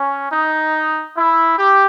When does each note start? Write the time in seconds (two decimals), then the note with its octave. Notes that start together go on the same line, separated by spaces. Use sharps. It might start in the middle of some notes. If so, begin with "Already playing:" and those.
Already playing: C#4
0.31 D#4
1.17 E4
1.58 G4